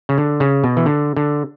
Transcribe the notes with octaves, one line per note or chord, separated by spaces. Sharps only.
C#3
D3
C#3
B2
E3
D3
D3